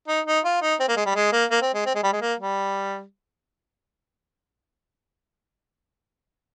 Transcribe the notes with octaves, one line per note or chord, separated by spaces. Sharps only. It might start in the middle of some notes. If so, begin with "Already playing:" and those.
D#4
D#4
F4
D#4
C4
A#3
G#3
G3
G#3
A#3
A#3
C4
G#3
C4
G#3
G3
G#3
A#3
G3